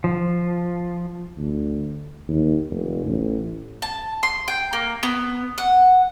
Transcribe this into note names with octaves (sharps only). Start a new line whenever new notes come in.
F3
D2
D#2
F1
A1
A5
C6
G5
A#3
B3
F#5